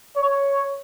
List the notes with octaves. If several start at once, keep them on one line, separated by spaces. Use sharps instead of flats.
C#5